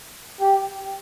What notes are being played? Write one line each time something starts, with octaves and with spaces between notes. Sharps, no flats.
G4